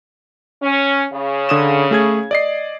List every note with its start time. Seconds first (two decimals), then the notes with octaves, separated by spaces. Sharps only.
0.63 C#4
1.12 C#3
1.49 D3 D#6 E7
1.91 A3 G#4 G#6
2.31 D5 D#5 C7